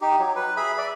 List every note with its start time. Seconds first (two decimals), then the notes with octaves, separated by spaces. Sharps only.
0.01 D#4 G4
0.19 F#3
0.36 B4
0.57 G#4 E5 B5
0.78 D5 E5